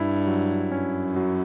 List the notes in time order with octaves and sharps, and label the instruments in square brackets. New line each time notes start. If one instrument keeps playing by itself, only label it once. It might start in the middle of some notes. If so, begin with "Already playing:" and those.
Already playing: [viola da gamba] G2 [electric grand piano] E4
[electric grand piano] F#3
[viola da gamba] F#2 [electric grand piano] C#4
[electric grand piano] F#3